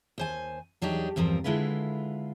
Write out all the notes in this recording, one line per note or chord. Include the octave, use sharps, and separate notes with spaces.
D#2 C5 G#5
E2 F#3 D4 D#4 G4
E2 G2 F3 C4 A#4
D3 G#3 E4 F4 B4